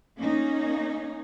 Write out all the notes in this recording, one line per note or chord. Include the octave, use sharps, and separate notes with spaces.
A#3 C#4 D#4